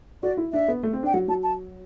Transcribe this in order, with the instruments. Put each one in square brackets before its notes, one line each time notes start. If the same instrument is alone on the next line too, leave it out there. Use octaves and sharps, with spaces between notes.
[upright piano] F#4 [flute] D5
[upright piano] E4
[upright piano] D4 [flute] E5
[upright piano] B3
A3
C4
D4
[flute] G5
[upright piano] F#3 [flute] F#5
[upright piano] F#3 [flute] A5
[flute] A5